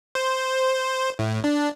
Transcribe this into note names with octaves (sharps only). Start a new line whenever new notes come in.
C5
A2
D4